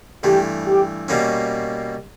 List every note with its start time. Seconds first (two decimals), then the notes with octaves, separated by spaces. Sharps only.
0.23 G2 E3 A3 G4
0.67 G4
1.08 B2 G3 A#3 C#4